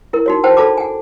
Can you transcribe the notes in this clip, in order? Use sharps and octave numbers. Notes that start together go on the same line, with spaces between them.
E4 A#4
D#4 F#4 C#5
C5 F#5 G5 A5
F4 A4 D5 A5 B5 D6
F#5 G#5